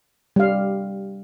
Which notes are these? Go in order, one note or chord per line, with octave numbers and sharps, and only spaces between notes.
G3 F5